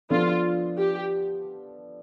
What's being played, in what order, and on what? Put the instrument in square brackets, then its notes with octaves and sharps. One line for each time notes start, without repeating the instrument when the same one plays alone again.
[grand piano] F3 B3 D4 A4 [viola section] F4
[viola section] G4